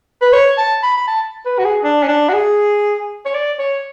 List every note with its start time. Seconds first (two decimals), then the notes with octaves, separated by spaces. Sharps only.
0.22 B4
0.33 C#5
0.58 A5
0.83 B5
0.97 B5
1.07 A5
1.46 B4
1.58 F#4
1.64 G#4
1.83 D4
2.03 C#4
2.08 D4
2.29 F#4
2.33 G#4
3.25 C#5
3.34 D5
3.59 C#5